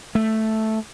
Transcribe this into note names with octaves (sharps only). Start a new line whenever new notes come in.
A3